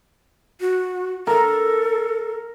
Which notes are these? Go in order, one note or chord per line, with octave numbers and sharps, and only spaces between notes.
F#4
A4 A#4